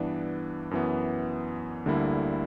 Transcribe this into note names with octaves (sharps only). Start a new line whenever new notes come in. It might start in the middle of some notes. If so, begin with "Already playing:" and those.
Already playing: G2 E3 B3 D4
F#2 E3 B3
D2 D3 G3 A#3 E4